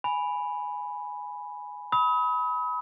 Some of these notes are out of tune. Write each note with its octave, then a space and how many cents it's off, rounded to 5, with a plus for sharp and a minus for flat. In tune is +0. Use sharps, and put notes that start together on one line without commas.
G#5 +0 B5 +0
B5 +0 D#6 +40